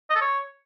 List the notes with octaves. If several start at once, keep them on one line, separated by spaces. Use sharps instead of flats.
D#5
A4
C#5